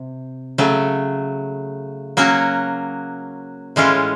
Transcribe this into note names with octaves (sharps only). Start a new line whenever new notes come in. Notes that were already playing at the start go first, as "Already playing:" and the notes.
Already playing: C3
C#3 F#3 A3
F#3 A#3 C#4 F#4
A2 E3 G#3 C#4 F4